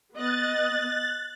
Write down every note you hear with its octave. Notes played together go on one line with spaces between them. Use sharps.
B3 D#5 F#6 A6